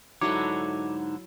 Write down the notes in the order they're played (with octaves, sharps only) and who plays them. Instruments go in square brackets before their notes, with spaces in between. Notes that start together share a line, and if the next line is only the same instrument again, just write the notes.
[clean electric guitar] G#2 D3 C#5 [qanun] F#3 E4 A4 [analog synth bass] D#4 [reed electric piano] D6